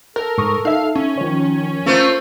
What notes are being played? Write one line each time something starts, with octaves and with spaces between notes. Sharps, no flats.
A4 A#4
G#2 C#6 D#6
D#4 E5 F5
C#4
D#3 F3 C#5
A3 A#3 C#4 F4 C5